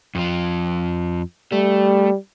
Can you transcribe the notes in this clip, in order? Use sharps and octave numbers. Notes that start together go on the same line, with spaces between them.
F2 F3
G3 A3